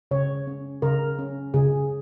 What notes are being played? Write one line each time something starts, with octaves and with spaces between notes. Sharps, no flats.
C#3 C#5
C#4
C#3 A#4
C#4
C#3 G#4